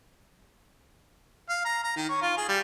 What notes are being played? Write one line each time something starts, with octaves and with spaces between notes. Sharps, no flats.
F5
A#5
A#5
D#3
C#5
F4
G#4
G3